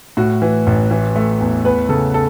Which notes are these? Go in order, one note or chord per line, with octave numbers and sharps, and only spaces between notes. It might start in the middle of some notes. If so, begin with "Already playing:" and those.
A2 F#4
E3
A1
E3
A3
E2
E2 B4
C#3 A4
A4